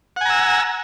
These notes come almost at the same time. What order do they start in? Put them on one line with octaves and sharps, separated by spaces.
F#5 G#5 A#5 E6